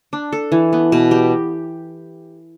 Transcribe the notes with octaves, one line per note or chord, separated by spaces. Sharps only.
D4
A4
E3
B3
B2
G4